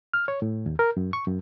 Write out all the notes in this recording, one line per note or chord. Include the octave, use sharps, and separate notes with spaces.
F6
C#5
A2
D#2
A#4
F#2
C#6
F#2